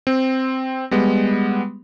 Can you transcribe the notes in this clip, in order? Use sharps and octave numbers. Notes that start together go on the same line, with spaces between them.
C4
G3 G#3 B3